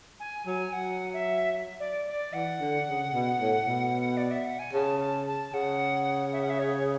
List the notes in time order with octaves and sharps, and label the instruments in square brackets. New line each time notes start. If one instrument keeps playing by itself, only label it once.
[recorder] G#5
[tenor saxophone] F#3 [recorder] G#5
[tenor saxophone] F#3 [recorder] F#5
[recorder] E5
D5
D5
[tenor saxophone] E3 [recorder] F#5
[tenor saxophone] D3
C#3
B2
A2
B2
[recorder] D5
E5
F#5
G#5
[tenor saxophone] C#3 [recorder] A5
[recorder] A5
A5
[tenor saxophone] C#3 [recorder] F#5
[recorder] E5
F#5
E5
C#5